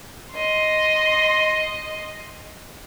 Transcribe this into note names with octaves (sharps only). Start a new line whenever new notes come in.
D#5 C6